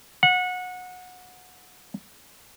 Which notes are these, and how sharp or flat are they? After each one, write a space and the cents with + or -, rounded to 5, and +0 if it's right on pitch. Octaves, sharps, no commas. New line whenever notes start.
F#5 -25